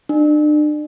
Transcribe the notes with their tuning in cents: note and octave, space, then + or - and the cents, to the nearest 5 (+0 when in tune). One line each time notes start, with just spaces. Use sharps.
D4 +40